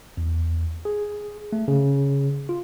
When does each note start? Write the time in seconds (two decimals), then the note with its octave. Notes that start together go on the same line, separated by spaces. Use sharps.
0.17 E2
0.85 G#4
1.53 A3
1.68 C#3
2.49 F4